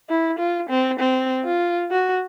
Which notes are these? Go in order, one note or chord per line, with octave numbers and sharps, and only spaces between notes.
E4
F4
C4
C4
F4
F#4